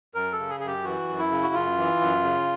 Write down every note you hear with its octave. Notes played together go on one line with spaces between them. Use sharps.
F#2 A#4
A4
C#3
G#4
F#2 G#4
G4
E3 F#4
F#2
E4
C#3
F#4
F#2 F4
E3
F#2
C#3